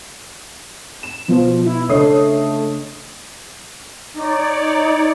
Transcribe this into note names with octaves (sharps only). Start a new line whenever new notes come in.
E7
B2 F3
E4
C#3 A3 D4 C#5 D#5 D#6 C7
D#4 C#5 D5